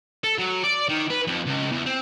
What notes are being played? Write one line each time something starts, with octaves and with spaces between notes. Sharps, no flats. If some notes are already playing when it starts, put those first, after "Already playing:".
A4
F#3
D5
D#3
B4
F2
C#2
E2
C4